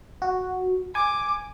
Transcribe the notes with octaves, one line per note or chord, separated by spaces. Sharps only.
F#4
G#5 D6